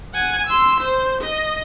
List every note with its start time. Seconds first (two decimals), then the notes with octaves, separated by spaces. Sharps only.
0.14 F#5 G#5
0.47 C6 E6
0.81 C5
1.21 D#5